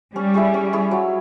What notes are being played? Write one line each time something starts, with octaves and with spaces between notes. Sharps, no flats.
G3 C#4
E4 G#4 C#5
C#4
E4 G#4 C#5
F#3